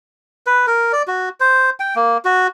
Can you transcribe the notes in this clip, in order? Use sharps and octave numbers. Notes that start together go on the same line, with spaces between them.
B4
A#4
D5
F#4
C5
G5
A#3
F#4